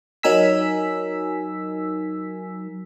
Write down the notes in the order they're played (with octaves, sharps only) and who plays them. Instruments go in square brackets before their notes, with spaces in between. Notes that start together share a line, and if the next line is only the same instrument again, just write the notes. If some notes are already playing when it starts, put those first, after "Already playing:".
[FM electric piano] F#3 D#4 A#4 G#5 E6 B6